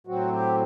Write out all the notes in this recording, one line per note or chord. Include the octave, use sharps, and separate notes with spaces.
A2 F#3 C4 F#4
G4